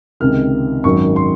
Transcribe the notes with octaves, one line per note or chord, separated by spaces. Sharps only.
C#2 C3 D#3 F6
G#1 F#2 D#3 F#3 C#6
C6